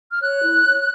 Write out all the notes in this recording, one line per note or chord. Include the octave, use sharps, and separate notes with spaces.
F6
C#5 F#6
E4
C#5